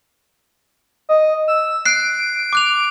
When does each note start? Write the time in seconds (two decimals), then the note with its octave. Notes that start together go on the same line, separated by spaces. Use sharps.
1.09 D#5
1.48 E6
1.86 F#6 C7 D7
2.53 D6 F#6 F7